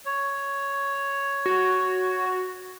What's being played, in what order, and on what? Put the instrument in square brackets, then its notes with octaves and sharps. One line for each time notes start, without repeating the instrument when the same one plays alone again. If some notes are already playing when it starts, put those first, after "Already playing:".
[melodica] C#5
[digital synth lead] F#4